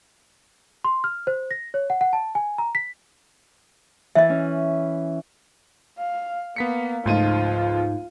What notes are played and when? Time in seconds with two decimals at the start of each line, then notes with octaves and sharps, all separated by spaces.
0.84 C6
1.04 F6
1.27 C5
1.51 A#6
1.74 C#5
1.90 F#5
2.01 F#5
2.13 A5
2.35 G#5
2.58 A#5
2.75 B6
4.15 E3 D#5 E5
4.29 C#4
5.98 F5
6.56 A#3 B3 B6 C#7
7.06 C#2 G#2 F3 A3 D#4 F4 D#7